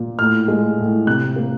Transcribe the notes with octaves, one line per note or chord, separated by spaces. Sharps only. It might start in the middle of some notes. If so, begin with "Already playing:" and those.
Already playing: A#2
A2 F6
G#3
A2
C3 F#6
A#3